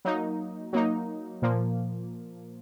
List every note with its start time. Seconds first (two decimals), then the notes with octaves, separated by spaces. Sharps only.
0.05 F#3 A#3 D#4
0.73 F#3 A#3 D#4
1.42 A#2 F3 A#3